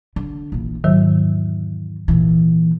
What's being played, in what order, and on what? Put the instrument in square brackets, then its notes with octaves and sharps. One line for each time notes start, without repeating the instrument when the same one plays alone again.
[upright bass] D3
A#1 E3
[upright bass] E2 [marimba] G#2 D#3 F#3
[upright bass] A#2 E3